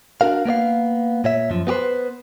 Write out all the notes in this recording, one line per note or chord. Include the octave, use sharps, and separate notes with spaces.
D4 F#4 A#4 F5
A#3 B3 D5 F5
A#2 C#5 E5
F#2 F3
B3 F#4 G4 B4 C5